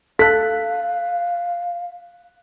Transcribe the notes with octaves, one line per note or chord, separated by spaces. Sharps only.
A4 F5 F#6 B6